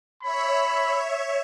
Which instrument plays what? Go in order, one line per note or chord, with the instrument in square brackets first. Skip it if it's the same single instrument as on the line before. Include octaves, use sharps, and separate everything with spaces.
[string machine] C#5 E5 [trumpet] B5